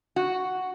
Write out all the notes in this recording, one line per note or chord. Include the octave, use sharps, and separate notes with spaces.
F#4